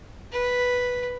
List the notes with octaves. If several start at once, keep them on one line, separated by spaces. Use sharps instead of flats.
B4